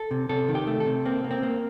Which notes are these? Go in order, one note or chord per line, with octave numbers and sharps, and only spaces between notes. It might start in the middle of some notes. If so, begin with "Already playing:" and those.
Already playing: A4
C3
C3 A4
D#3
G4
A3
A4
C3
A#3 C4
A#3
C4
A#3